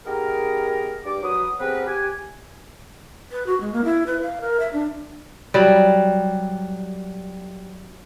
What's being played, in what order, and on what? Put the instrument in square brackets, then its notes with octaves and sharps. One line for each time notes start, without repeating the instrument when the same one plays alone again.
[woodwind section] B3 D#4 G4 G#4 A#4
G2 D6
F#3 B4 D#6
B3 C4 G4 G#4 A#4 B4
G4 G#5
[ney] B4
F#4
G#3
A#3
E4
B4
F5
A#4
E5
D4
[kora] F#3 G3